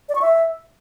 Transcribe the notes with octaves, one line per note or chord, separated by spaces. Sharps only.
D5
C#6
E5